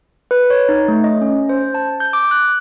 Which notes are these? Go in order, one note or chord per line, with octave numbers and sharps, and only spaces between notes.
B4
C#5
D#4
A3
D#5
C#4
C5
A5
G6
D6
F#6